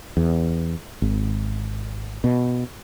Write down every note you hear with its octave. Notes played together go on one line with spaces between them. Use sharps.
E2
G#1
B2